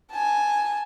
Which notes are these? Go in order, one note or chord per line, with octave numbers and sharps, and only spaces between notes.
G#5 A5